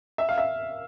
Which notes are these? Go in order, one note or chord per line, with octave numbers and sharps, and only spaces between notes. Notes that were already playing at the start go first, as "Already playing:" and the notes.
E5
F5
E5